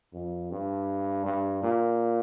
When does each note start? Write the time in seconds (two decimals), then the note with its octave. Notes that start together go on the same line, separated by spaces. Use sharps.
0.13 F2
0.51 G2
1.25 G2
1.62 A#2